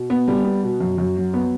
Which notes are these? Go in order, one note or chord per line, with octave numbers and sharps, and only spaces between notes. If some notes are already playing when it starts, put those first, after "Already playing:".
Already playing: B2
B3
G3
B3
B2
F#2
F#2
F#3
B3